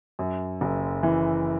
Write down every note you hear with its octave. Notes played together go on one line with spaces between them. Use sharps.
F#2
F#1
E3